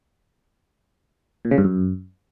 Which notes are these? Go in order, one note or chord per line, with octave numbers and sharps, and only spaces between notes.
A#2
C#3
G2
F#2